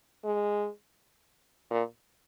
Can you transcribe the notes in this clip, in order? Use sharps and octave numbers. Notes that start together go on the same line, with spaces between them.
G#3
A#2